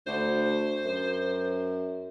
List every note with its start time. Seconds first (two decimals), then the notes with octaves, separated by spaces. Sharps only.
0.07 D2 C5
0.84 F#2